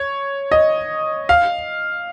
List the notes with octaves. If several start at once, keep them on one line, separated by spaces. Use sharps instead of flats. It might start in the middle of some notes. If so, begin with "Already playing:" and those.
Already playing: C#5
D#5
F5